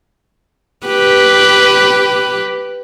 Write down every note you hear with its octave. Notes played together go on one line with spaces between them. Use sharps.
G4 B4